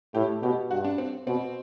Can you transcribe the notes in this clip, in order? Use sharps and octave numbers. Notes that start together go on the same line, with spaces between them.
A2 G4
B2 G4
G2 F#4
D4
C4
B2 C4